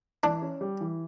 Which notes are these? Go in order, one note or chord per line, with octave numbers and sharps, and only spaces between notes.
E3 D4
C#4
G3
E3